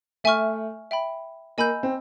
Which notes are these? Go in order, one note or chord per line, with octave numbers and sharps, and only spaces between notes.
A3 E5 G#5 C#6 F6
E5 G5 B5
A#3 D#5 G#5 B5 E6 G6
C4